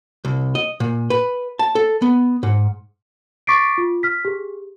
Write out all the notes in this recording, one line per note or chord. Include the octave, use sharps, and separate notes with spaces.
C2
D#5
A#2
B4
A5
A4
B3
G#2
C#6 D6 A6 B6 C7 D7
F4
F6 B6
G4 G#4